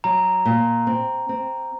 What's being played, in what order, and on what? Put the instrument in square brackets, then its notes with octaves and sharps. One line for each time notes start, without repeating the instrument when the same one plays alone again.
[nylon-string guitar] F#3 [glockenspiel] A#5
[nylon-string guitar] A#2
C4
C4